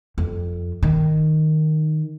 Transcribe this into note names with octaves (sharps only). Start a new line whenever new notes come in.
F2
D#3